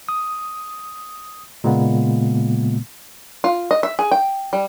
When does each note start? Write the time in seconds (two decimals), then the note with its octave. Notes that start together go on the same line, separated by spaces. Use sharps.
0.09 D#6
1.64 A#2 C#3 G#3 A#3 B3
3.44 F4
3.71 D#5
3.83 E5
3.99 G#4
4.12 G5
4.53 G3